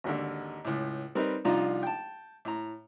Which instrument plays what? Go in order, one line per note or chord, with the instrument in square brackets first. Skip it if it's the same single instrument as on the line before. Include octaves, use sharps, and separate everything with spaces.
[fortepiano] G#1 D#2 D3
C#2 A2
G3 C4 D#4 A#4 B4
C2 F3 D4 D#4 F4 A#5
G5 A5
A2 A#5